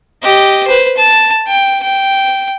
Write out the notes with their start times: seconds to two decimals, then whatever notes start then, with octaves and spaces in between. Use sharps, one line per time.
0.23 G4 D#5
0.67 B4 C5
0.97 A5
1.47 G5
1.83 G5